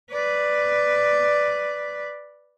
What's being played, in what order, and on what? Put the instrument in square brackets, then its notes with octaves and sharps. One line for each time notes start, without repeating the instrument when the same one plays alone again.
[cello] B4 D5